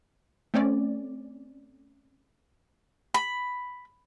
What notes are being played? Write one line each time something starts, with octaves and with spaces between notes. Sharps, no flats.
A3 C4 C#4 D5
B5